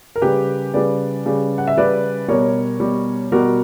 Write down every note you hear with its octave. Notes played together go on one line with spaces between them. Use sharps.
A#4
C#3 G3 G4 B4
C#3 G3 B4 D5
C#3 G3
F#5
E5
C#3 G3 B4 D5
B2 G3 A#4 C#5
B2 G3
B2 G3 F#4 A#4